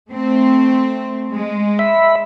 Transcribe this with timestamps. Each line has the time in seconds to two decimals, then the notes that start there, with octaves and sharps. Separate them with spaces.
0.11 A3 C4
1.33 G#3
1.79 E5 B5